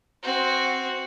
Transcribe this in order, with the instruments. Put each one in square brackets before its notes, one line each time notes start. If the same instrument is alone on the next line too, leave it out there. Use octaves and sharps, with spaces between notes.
[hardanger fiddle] C4 F#4